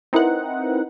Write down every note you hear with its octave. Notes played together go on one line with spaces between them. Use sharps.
C4 D#4 E4 A#4 B4 F#5